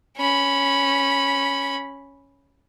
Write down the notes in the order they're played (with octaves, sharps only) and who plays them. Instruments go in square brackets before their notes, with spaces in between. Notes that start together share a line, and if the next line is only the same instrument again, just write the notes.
[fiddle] C#4 B5